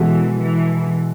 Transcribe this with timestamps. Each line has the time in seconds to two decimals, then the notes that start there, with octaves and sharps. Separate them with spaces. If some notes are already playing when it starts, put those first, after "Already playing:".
Already playing: B2 E3 G#3 B3 F#4 A4
0.42 E3